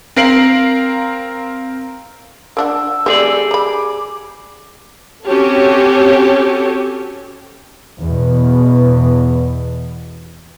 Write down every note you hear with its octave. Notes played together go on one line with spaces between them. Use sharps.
C4 A#4 F5 C7 D7 F#7
A#3 D4 F#5 E6
A3 C4 G4 G#4 D5
A#5 B5 D6
C4 C#4 F#4 G4 A4 C#5
E2 B2